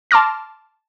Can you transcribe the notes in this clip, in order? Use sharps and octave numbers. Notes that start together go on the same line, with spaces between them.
A5 C6 D6 F6 A#6